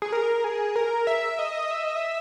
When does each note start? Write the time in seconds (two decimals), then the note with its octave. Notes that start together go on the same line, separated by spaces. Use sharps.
0.02 G#4
0.12 A#4
0.44 G#4
0.76 A#4
1.07 E5
1.39 D#5
1.71 E5
1.84 D#5
1.96 E5